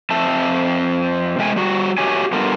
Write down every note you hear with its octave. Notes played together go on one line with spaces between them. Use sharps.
F2 C4 E5 A5
C3 G#3 A3 G5 G#5
G3 F#4
A3 F#4 G4 C#5 G#5
G3 B3 D4 F4 A4 A#4